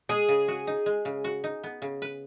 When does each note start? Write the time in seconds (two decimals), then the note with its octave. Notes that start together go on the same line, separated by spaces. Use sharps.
0.09 G#3 G#4
0.28 C#3
0.48 F#4
0.67 D#4
0.86 G#3
1.05 C#3
1.24 F#4
1.44 D#4
1.64 B3
1.82 C#3
2.02 B4